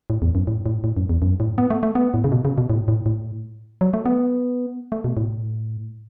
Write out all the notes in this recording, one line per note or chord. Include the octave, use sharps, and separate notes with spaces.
A2
E2
F#2
A2
A2
A2
F#2
E2
F#2
A2
B3
A3
A3
B3
A2
C#3
B2
C#3
B2
A2
A2
A2
F#3
A3
B3
A3
B2
A2